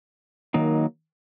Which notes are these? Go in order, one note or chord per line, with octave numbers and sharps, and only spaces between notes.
D#3 F#3 A#3 D#4